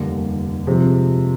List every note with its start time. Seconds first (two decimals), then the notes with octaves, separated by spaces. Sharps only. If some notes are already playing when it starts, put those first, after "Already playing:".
Already playing: F1 D#2 D3 G3
0.67 C3 F3 G#3 C4